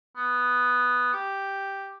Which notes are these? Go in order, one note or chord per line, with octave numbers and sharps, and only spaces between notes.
B3
G4